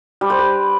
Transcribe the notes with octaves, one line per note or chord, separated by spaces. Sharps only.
G3
C5
B4